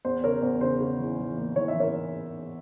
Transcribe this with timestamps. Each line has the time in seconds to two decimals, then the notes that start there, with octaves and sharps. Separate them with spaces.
0.05 E2 C5
0.24 C#3 A#4 C#5
0.42 E2 C5
0.61 C#3 C5
0.81 C#3
0.99 E3
1.19 E3
1.37 A#3
1.56 E3 C#5
1.68 E5
1.75 E3 A#4 C#5